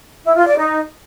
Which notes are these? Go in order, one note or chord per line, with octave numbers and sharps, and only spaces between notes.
E4
F4
D5
D#4